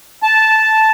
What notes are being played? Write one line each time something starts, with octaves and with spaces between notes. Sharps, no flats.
A5